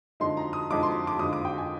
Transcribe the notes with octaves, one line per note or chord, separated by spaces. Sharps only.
F2 D3 G#3 D#4 C6
A#5
D#6
F2 D3 G#3 D#4 D6
C6
D6
F2 D3 G#3 D#4 D#6
D6
G5
G#5